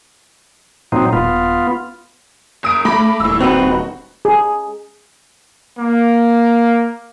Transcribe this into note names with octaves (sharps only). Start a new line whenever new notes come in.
A#2 F#3 C4 D#4
D#1 B3 F4
F#1 D#6 D7
A3 B5 D6 A#6
D#1 A2 E6
C4 D#4 F#4 B4
G#4
A#3